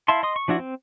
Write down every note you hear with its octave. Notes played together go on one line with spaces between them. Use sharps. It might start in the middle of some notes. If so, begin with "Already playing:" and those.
E4 E5 F5 A5 C6
D#5 C6 D#6
C#6
F3 D4 E4 F#4
C4